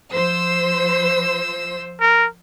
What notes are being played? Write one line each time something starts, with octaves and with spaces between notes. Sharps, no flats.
F3 C5 E6
A#4